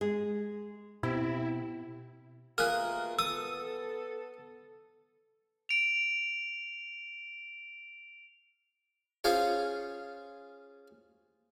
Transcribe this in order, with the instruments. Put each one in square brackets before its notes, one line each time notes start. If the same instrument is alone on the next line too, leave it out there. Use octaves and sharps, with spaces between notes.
[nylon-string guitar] G#3 G#4
[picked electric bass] B2 [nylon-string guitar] C4 G4 [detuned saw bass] E4
[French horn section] B2 A3 F4 [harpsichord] A#3 G#4 [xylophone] F6 F#6
[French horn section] B3 A4 [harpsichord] D#6 [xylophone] E6
[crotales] D7 F7
[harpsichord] C#4 F4 G#4 C5 C#5